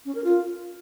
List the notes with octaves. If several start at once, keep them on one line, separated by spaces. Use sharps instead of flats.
C#4
A#4
F4